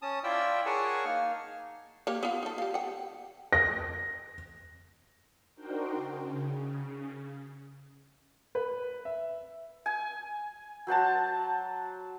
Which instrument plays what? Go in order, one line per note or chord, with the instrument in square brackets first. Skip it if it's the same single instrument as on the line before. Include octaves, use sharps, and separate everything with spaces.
[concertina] C#4 A5 D#6
E4 F4 D5 E5 G5 E6
G#4 A#4 C#5 F#5 G#5 A5
A#3 D#4 F6
[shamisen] A#3 G4 C#5
B3 F4
D#4 A4
G4 F5
F#5 G5
[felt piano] A#6
[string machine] D4 D#4 F#4 A#4 C5 G5
C#3
[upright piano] B4
E5
[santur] G#5
F#3 C5 F#5 A5